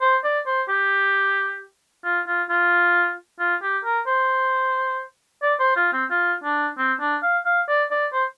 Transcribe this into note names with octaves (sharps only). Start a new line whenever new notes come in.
C5
D5
C5
G4
F4
F4
F4
F4
G4
A#4
C5
D5
C5
F4
C4
F4
D4
C4
D4
F5
F5
D5
D5
C5